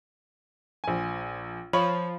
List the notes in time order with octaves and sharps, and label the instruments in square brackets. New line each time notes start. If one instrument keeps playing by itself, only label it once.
[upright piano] A#1 G#5
[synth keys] F3 [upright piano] C#5 [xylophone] B5